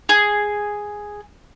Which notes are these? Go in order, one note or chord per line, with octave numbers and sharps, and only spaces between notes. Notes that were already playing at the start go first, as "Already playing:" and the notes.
G#4